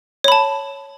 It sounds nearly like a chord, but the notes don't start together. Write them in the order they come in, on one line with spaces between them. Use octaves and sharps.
C#5 B5 A5